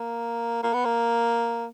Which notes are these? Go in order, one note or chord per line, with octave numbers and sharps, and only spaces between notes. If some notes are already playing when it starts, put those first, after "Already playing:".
Already playing: A#3
A#3
B3
A#3